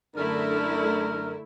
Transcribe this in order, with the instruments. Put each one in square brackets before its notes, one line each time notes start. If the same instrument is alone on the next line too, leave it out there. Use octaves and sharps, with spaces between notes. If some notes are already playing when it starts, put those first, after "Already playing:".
[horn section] F#2 D4 A#4 [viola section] D3 A3 E4